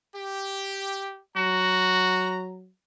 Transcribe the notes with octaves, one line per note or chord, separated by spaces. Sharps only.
G4
F#3 F#4 A#5